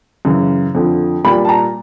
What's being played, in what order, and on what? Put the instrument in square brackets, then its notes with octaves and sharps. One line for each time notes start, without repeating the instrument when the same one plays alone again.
[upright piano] F#2 C#3 E3
F2 D3 F3
A#2 G3 A#3 B5
A5
A#5